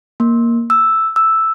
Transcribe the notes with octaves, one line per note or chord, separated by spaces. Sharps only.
A#3
E6
E6